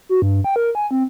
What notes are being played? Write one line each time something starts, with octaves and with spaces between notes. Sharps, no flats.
F#4
G2
G5
A#4
G#5
C4